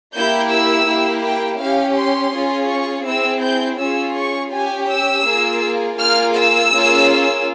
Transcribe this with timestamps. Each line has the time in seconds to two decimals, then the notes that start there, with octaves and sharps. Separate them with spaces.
0.14 A#3 E4 G4 G6
0.50 E6
0.87 A#3 E4 G4
1.23 G5
1.59 C#4 G4 F5
1.96 C6
2.32 C#4 F4 G#4
2.69 C#6
3.05 C4 E4 G#4 E6
3.42 G6
3.78 C#4 F4 G#4 E6
4.15 C#6
4.51 C#4 G4 G#5
4.88 E6
5.24 A#3 F4 G#4
5.97 A#3 F4 G#4 F6
6.34 E6
6.71 A#3 C#4 F4 G#4